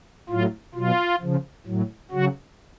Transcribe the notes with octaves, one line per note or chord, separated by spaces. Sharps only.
A2 F#3 F4
B2 F#3 F4
C#3 F3
A2 F#3
C#3 F#3 F#4